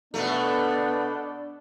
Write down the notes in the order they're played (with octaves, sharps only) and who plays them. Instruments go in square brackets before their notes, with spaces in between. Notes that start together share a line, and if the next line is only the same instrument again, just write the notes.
[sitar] B2 A3 [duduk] B3 [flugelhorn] D4